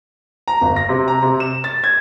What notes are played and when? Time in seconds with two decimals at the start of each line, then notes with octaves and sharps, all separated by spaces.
0.48 A#5
0.61 G1
0.76 A#6
0.89 C3
1.08 A#5
1.22 C3
1.40 E7
1.64 A6
1.84 G#6